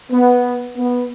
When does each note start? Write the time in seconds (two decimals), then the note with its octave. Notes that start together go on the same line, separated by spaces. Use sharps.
0.11 B3
0.77 B3